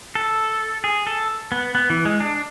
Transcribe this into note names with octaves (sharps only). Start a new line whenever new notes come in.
A4
G#4
A4
B3
B3
E3
G#3
D4